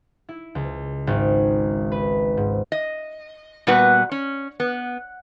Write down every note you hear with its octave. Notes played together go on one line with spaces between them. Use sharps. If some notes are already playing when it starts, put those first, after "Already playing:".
E4
C#2
G#1
B4
G#2
D#5
A#2 G3 B3 F#4 B4 F#5
C#4
B3